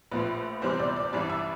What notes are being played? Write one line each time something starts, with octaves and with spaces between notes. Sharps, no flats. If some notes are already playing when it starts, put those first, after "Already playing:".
A#1 A2 F3 B4
E2 C3 E3 G3 C5
D5
D5
A1 G2 E3 G3 D5
E5